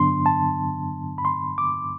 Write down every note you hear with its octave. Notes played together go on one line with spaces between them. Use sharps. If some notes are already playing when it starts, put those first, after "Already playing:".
Already playing: G2 D3 F#3 B3 D4 C6
A5
B5
C6
D6